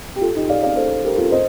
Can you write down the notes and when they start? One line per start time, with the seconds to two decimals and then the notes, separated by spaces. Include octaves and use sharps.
0.16 G4
0.21 F4 A4
0.36 D#4 G4
0.49 D5 F5
0.63 D5 F5
0.76 A4 C5
1.04 G4 A#4
1.17 F4 A4
1.31 C5 D#5